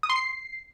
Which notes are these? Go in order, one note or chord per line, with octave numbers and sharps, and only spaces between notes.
D#6
C6
C7